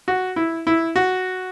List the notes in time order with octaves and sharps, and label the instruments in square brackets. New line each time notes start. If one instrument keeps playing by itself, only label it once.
[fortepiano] F#4
E4
E4
F#4